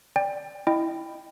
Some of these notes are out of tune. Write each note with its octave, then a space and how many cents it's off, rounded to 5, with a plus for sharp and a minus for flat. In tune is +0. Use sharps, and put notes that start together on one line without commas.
D5 +0 G5 +25
E4 +0 D#5 -20 G5 +0